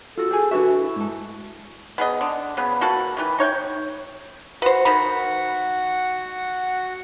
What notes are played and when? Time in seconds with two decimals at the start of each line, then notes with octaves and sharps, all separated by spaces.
0.18 F4 F#4 A4
0.31 G4 G#4 G#5
0.51 D4 F#4 B4 E5
0.79 E4
0.96 G#2 A4
1.98 B3 G#4 D#5
2.21 D3
2.57 C#3 B3 B4
2.81 A#3 F#4 A4 B4
3.17 D#3 E3 B4
3.38 D#4 C#5 F#5 G5
4.62 F#4 B4 C5 F#5
4.85 D#3 B5